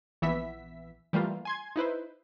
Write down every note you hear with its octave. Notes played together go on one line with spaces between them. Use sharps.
A#1 E3 B3 E5 B6
E3 G3 A3 A#3 F4
G#5 C6 G#6
D#4 E4 B4 C5